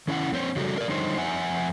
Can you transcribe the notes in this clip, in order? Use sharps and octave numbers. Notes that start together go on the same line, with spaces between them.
D#3 C#4 E4 F5 F#5
F2 C4 C5 C#5
C#3 F#3 G3 F#4 G4 A4
D4 A#4 D5
F2 D3 G3 D#4 C5 C#5
F2 E5 F#5 G#5